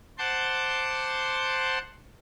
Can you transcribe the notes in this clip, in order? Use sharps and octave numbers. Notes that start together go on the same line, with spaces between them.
C5 F#5 A5 C6 D6 G6